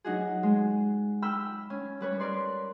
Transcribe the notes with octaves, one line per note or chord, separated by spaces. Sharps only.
F#3 D#4 F#4 G#4
G#3
G5 B5 E6 F6
C#4
G3 B4 C#5
A#4 B4 D5 C6